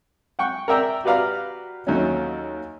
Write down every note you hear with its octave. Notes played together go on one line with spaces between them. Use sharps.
F#5 G5 C#6
A#4 D5 E5 G5 A#5
F#4 G4 B4 D5 F5 A#5
D#2 F#3 A3 C#4